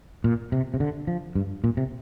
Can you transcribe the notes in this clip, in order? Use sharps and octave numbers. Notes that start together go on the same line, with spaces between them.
A#2
C3
C3
D3
F3
G2
A#2
C3